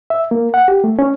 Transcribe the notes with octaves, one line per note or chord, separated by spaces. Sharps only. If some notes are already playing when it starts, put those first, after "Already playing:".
E5
A#3
F#5
G4
A3
C#4